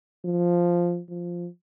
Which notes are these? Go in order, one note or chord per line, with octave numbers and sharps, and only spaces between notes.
F3
F3